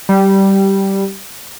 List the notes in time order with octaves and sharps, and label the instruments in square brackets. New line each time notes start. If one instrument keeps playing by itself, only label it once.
[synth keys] G3